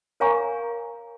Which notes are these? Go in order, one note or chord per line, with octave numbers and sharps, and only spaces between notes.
A#4 C#5 F5 G#5 A#5 C#6